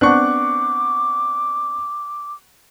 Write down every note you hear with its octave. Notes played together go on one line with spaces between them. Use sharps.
B3 C4 D4 F#5 C#6 D6 F#6